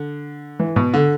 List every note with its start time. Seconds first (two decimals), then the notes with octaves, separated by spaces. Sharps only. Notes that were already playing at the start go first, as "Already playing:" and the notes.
Already playing: D3
0.59 E3
0.76 B2
0.94 D3